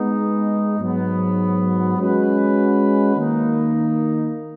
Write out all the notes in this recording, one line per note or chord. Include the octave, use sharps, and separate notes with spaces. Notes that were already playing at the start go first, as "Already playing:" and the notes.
Already playing: G#3 B3 D#4
G#2 F#3 B3
G#3 C#4 F#4 B4
D#3 A#3 D#4